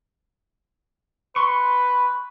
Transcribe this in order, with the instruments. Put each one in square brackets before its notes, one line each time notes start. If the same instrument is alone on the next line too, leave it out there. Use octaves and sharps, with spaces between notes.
[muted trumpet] B4 [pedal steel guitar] C6 C#6